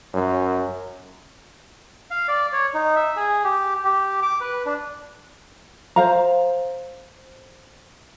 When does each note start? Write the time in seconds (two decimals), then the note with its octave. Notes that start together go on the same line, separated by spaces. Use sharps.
0.14 F#2
2.11 F5
2.28 D5
2.53 C#5
2.74 D#4
2.96 E5
3.16 G#4
3.44 G4
3.84 G4
4.23 D6
4.41 B4
4.66 D4
5.96 C5 F5 A#5